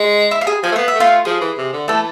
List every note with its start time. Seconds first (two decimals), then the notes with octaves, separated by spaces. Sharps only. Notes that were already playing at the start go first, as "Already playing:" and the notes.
Already playing: G#3
0.31 E4 E5
0.41 F5
0.47 G#4 G#5
0.63 F3 G#5
0.72 A3
0.76 B3 F5
0.88 E5
0.95 A3
1.00 F4 F5
1.25 F3 G#4
1.41 E3
1.58 C3
1.73 D3
1.88 E3 A3 A4